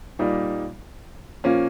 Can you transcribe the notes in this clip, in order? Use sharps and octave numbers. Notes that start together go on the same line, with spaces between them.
A#2 G3 A#3 D#4
A#2 F3 A#3 C#4